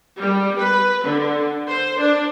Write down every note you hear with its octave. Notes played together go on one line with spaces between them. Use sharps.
G3
B4
D3
C5
D4